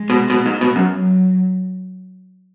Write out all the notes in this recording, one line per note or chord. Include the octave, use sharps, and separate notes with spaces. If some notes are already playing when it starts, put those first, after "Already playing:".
Already playing: G#3
B2
B2
G#2
B2
F#2
F#3